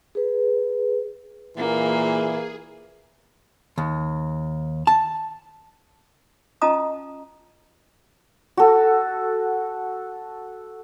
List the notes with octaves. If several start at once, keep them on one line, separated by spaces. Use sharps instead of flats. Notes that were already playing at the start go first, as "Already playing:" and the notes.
G#4 B4
A#2 E3 A#3 G#4
D#2
A5
C#4 F4 D#5 A5 A#5 D#6
F#4 A4